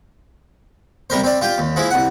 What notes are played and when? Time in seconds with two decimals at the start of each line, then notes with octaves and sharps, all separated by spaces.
1.10 C3 G3 A#4 C5
1.24 C4 D5
1.41 F4 G4 G5
1.58 D#2
1.76 F3 G#3 E4
1.91 C2 F#5